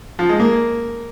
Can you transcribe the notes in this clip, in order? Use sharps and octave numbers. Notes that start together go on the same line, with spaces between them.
F3
G#3
A#3